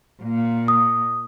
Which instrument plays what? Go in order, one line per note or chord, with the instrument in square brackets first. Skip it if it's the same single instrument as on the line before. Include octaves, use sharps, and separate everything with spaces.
[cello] A#2
[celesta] D#6